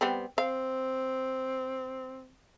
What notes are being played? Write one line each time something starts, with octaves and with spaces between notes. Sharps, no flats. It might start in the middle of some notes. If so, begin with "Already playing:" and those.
G3 B3 C4
C4 F5